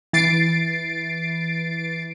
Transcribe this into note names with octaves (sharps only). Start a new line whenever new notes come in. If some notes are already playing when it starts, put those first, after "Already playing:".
E3 A6 C7 D7